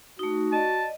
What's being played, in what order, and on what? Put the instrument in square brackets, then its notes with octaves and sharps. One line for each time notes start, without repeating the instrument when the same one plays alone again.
[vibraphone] A3 D#4 [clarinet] F#4
[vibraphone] D5 D#5 [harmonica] A5